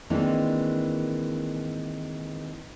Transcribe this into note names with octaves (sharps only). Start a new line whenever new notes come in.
D#3 E3 G#3 A#3 C4 D4